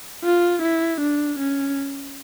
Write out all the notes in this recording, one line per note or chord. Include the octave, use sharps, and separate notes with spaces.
F4
E4
D4
C#4